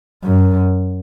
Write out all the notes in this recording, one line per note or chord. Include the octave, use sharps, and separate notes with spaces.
F#2